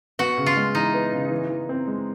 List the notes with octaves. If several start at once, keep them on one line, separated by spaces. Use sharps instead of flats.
B3 F#4
C#3
F4
G#3
E3 D#4
B3
C#3
E3
E3
C4
G#3